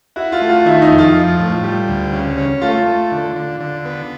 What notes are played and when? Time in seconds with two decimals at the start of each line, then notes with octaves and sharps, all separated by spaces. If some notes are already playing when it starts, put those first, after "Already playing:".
0.16 E4 F#4
0.32 F4
0.41 A3
0.49 F4
0.66 D#3 E4
0.82 D#4
0.91 F2
0.98 F4
1.15 F3
1.39 A2
1.63 G3
1.88 D2
2.13 C#3
2.38 C#4
2.62 A3 F4
2.86 A3
3.12 D3
3.36 D3
3.60 D3
3.85 B3